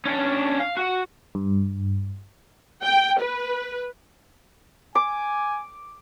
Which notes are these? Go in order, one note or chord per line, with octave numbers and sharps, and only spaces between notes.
C#4 D4
F5
F#4
G2
G5
B4
G#5 D6